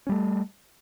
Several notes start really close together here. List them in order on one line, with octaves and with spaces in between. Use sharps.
C#4 G3 A3